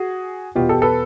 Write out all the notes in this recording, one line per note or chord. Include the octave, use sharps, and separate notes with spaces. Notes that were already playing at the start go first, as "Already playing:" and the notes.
Already playing: F#4 G#4
E2 B2 F4 G4
G4 A4
A4 B4